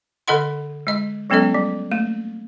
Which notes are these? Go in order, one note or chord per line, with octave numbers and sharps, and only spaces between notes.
D3 A4 D#5 F#5 C6
G#3 D#5
F#3 G#3 B3 C#4 A4 D#5
G3
A3 A#3